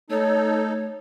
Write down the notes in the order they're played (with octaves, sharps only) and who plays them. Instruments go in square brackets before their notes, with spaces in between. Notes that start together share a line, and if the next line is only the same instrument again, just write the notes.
[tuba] A3 [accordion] D#4 A4 [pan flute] C#5